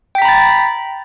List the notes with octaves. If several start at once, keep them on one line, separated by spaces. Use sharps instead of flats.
G5 A#5 B5 A6 B6